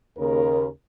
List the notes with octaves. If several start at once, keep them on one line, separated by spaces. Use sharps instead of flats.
D#2 C#3 A#4